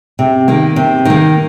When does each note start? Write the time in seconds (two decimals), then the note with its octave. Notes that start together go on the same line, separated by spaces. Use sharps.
0.19 C3
0.48 D#3 A#3
0.76 C3
1.05 D#3 A#3